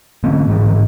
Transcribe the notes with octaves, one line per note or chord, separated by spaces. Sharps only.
D3 A3 C4 C#4
A1 D2 G#2 G#3